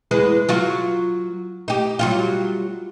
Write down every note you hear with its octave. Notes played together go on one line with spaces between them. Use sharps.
E2 G#3 B4
F#3 F4 F#4
D#4 G4
F#3 G3 F4